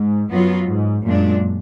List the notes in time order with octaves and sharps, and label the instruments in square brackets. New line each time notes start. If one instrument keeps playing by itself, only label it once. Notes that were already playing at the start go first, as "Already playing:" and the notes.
Already playing: [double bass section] G#2
[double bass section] F#2 [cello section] F#3 B3 F4
[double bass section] G#2
[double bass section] F#2 [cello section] A#2 G#3 D4